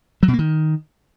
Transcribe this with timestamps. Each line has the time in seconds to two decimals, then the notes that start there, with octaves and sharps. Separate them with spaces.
0.23 F#3
0.28 B2
0.33 A#3
0.39 D#3